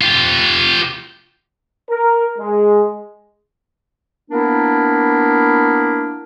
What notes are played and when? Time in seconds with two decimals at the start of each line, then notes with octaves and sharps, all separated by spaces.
0.01 F4 G4
1.90 A#4
2.39 G#3
4.30 A#3 B3 D4 E4 A#4